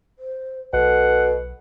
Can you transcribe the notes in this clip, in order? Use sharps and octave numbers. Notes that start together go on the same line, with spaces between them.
C5
B1 B2 A4 F#5